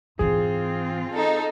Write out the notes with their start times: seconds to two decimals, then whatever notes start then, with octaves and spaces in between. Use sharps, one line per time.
0.19 G#2 E3 C4 F4 G#4
1.12 D#4 A4